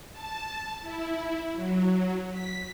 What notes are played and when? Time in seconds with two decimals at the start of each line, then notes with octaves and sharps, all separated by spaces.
0.12 A5
0.82 E4
1.54 F#3
2.31 B6